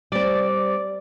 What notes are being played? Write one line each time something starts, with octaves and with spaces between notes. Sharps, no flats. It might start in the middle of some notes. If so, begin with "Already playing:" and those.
G3 C4 D5